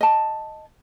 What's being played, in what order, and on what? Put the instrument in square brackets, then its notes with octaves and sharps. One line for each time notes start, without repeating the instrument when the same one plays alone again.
[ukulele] D#5 A5